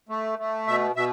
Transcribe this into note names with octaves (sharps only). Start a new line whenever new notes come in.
A3
A3
B2 E5
B2 E5